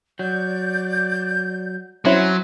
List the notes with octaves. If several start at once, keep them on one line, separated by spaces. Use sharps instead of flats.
F#3 D5 G6
F#3 C4 C#4 E4 F#5 G#5 C6